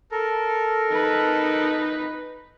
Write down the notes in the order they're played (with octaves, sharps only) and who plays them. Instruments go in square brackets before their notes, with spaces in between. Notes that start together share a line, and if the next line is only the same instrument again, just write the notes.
[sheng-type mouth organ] A4 A#4
[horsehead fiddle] D#4 B4